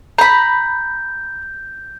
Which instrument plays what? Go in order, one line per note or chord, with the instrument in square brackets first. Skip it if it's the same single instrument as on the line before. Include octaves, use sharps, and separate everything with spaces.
[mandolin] A#5 B5 [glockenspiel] G6